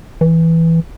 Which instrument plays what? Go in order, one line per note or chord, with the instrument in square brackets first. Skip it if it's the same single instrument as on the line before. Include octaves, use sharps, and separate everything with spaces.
[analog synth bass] E3